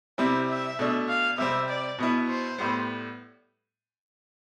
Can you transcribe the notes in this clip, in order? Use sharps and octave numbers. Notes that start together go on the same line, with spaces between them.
C3 G3 C4 E4 E5
E5
B2 A3 D4
F5
C3 G3 C4 E5
D5
B2 B3 E4
C5
A2 G3 B3